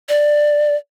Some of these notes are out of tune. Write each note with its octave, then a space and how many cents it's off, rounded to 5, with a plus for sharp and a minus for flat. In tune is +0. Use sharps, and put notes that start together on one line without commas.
D5 +10